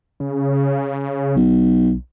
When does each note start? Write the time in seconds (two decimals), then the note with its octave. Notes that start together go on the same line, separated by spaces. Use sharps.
0.20 C#3
1.36 B1